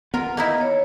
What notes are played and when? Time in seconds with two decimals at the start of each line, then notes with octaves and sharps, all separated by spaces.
0.14 B3 F4 A#4
0.37 A#3 D#4 E4 D#5
0.61 C#5